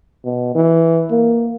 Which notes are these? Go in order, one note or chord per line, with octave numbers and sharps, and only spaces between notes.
B2
E3
A#3